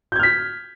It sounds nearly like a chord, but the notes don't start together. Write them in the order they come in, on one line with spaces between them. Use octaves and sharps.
G6 G#6 F6 B6